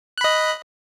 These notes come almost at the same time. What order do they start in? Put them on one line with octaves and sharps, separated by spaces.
F#6 B5 D#5